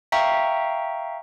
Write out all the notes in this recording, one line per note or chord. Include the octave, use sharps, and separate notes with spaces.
E5 F5 G5 A#5 C#6